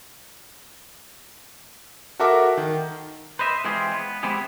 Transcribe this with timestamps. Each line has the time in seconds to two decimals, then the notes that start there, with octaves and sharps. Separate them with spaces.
2.20 F#4 A4 A#4 E5 D6
2.57 D#3
3.39 B4 C5 D#5 E5
3.64 E3 G#3 C4 F4 G4 G#4
3.92 B3
4.23 G#3 B3 C4 E4 G4 G#4